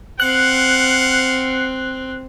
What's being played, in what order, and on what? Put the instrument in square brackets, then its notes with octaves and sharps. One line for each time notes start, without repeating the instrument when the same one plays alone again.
[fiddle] C4 [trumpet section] F5 F#5 [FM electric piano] F#6